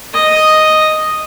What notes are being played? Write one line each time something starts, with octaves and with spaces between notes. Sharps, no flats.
D#5